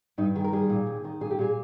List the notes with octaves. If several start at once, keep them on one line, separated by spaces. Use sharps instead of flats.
G2 D#4
D#3 G#4
A#4
G3 G#4
A#2
D#2
D#3
A#2 G#4
G4
A#2 G#4